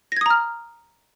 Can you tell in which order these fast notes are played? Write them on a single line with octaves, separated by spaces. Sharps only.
A#6 G#6 D#6 A#5 F6